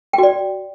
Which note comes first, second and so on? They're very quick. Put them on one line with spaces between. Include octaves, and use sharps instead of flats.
G5 F#4 D5